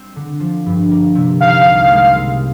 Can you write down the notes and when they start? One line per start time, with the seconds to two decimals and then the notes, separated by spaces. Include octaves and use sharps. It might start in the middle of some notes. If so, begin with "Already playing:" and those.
Already playing: G3 C4
0.16 D3
0.40 F3
0.66 G2
0.91 A#3
1.15 C3
1.41 D#3 F5
1.66 C2
1.90 G#3
2.15 C3